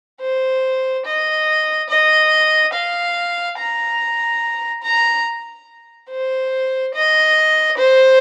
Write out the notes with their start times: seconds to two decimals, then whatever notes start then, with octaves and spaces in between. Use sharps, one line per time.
0.21 C5
1.06 D#5
1.89 D#5
2.73 F5
3.58 A#5
4.83 A#5
6.10 C5
6.94 D#5
7.77 C5